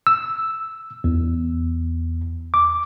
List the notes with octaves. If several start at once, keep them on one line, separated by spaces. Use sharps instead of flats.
E6
E2
D6